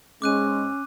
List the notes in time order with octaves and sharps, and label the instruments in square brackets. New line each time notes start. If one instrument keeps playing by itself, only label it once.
[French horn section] G#2 G#3 [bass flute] C#4 [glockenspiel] D6 F#6 D#7